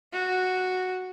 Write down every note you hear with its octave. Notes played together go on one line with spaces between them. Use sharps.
F#4